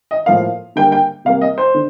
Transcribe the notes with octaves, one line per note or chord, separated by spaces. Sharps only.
D#5
A2 F3 A#3 F5
D3 G3 A#3 G5
G5
C3 G3 A#3 F5
D#5
C5
D3